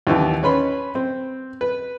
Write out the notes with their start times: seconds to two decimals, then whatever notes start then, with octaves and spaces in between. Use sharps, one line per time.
0.07 D#2 D3 E3 D4
0.43 C#4 B4 B5 C6
0.95 C4
1.61 B4